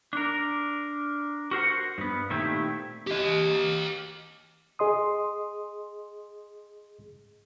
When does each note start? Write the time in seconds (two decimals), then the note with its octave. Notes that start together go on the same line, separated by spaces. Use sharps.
0.13 D4 A#4
1.51 F#4 A#4 C5 F#5
1.98 G2 B3
2.30 A#2 D#3 A3 C4 E4 G4
3.07 G4 D#5
4.79 G#4 D#5 C6 D#6